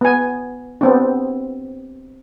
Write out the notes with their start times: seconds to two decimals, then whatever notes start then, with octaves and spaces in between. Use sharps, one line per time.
0.01 B3 G#5
0.81 B3 C4 D4